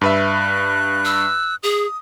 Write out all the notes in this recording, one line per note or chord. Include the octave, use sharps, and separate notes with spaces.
G2 B4 E5 F#6
E6
G#4 D#6